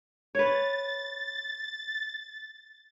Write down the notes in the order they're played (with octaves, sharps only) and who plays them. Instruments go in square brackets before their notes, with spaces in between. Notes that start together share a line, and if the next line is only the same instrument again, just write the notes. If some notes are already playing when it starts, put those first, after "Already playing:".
[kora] B4 C#5 [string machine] A6